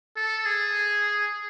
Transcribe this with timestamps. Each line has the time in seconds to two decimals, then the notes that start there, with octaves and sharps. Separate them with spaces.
0.17 A4
0.46 G#4